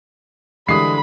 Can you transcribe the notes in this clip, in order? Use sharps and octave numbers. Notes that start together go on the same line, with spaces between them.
D3 E3 G3 G#3 B5 D#6 C7